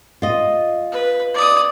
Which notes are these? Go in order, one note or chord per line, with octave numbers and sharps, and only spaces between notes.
F4 D#5
B4
D5 D#6